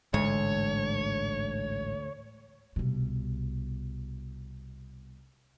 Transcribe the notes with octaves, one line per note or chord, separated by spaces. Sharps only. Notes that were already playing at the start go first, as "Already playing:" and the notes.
A1 D2 G#2 G#3 C#5
C2 B2